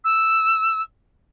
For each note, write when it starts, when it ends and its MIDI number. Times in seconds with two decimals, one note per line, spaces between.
0.04 0.81 88